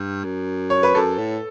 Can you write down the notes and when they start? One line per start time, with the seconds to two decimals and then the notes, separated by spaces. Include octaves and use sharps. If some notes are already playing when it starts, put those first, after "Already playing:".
Already playing: G2
0.24 F#2
0.70 C#5
0.83 B4
0.95 F#2 A4
1.18 A2